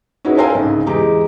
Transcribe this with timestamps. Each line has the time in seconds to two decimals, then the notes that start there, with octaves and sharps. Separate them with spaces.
0.25 C#4 D#4 E4 F#4 G#4 B4
0.37 A4 A#4 C5 F5 G5 G#5
0.55 C2 G#2 C#3
0.86 E2 G#3 G4 A#5